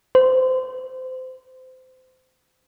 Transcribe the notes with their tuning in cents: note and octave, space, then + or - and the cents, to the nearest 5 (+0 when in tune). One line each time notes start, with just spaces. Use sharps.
C5 -25